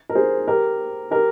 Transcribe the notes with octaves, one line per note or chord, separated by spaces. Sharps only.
A#4
G#4 C5
G4 A#4
G4 A#4